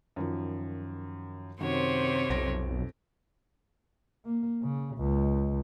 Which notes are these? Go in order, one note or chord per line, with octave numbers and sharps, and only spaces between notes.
F#2 D#3 F3
F#2 C3 D#3 F#4 C5 C#5
B1 F2 A#6 D7
A#3
C#3
C#2